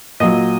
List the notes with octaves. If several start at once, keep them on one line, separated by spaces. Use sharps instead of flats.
A#2 F#3 D#5